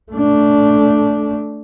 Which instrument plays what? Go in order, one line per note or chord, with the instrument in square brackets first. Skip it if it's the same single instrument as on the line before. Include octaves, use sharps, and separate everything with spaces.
[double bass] A3 D4